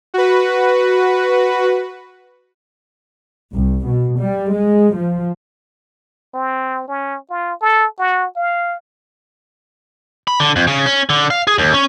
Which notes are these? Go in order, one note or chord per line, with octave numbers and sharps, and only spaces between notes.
F#4 B4
C2
B2
G3
G#3
F3
C4
C#4
F4
A4
F#4
F5
B5
D3
F2
C#3
C#4
D3
F5
G#4
D#2
C#4